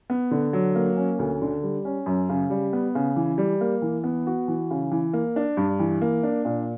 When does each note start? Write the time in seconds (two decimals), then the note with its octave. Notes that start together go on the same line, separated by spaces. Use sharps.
0.10 B3
0.31 D3
0.53 F#3
0.75 A#3
0.97 C#4
1.19 D2
1.42 D3
1.63 G3
1.85 C#4
2.06 F#2
2.29 C#3
2.50 G3
2.73 B3
2.95 C#3
3.16 E3
3.38 G3
3.61 A#3
3.82 E3
4.04 B3
4.27 F#4
4.48 E3
4.71 C#3
4.92 E3
5.13 A#3
5.36 D4
5.57 G2
5.80 E3
6.01 A#3
6.23 D4
6.45 A#2